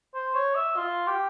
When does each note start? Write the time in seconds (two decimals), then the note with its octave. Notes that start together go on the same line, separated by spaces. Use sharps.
0.14 C5
0.35 C#5
0.55 E5
0.76 F4
1.07 G4